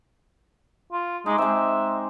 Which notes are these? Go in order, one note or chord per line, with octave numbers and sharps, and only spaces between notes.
F4
G#3 D#4 D6
G#3 C4 E5